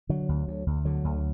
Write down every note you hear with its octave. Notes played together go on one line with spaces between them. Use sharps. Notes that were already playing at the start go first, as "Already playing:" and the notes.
D3 F#3
D2
D2
D2
D3 F#3
D2